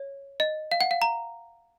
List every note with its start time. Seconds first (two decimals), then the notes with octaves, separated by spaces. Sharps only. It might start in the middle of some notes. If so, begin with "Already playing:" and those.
Already playing: C#5
0.40 D#5
0.71 F5
0.81 F#5
0.91 F5
1.02 A#5